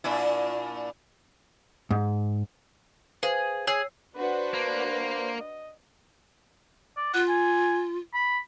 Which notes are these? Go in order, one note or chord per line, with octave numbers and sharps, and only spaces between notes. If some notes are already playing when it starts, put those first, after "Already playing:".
A#2 D4 E4
G#2
G#4 B4 C5 F5
G#4 C#5 E6 C7
D4 F#4 B4 C5
A#3
D#5
D5
F4 F#5
G#5
B5